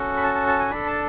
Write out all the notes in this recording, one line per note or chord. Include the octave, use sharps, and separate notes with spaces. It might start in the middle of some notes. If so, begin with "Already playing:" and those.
Already playing: C#4 F#4 A4
B5
A5
A5
A5
G#5
D4 A4 B5
A5